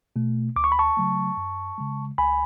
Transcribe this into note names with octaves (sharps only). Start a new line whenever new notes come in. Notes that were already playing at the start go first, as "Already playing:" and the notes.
B2 A3
D2 D6
C#6
B5
A5 C#6
C#3 F#3 A3
F#2
C#3 G#3
C#2 G#5 B5